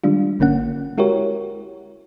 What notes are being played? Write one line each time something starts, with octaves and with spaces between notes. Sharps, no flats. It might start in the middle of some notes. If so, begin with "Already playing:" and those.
D#3 G3 G#3 D4 F4
G#1 D3 A#3 C#4 F#5
G#3 E4 F#4 G4 A#4 C#5